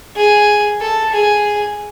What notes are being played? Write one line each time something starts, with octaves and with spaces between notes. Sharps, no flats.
G#4
A4
G#4